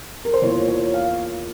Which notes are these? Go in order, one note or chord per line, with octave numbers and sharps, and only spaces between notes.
A#4
C5
E2 E3 A#3 F4 C#5
C#5
F5